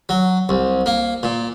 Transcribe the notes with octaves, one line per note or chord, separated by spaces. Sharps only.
F#3
C2
A#3
A#2